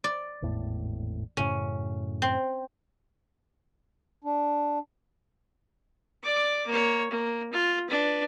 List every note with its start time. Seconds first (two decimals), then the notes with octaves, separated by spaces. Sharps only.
0.04 D5
0.42 G#1 E2 A2
1.37 F#2 A2 C#3 C#4
2.22 C4
4.24 D4
6.23 D5 D6
6.67 A#3 C#5
7.11 A#3
7.53 F4
7.88 D4 B4